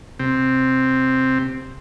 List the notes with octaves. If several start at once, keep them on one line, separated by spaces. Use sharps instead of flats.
C3 C4